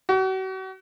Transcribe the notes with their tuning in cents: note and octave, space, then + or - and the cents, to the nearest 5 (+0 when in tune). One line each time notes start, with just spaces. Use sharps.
F#4 +40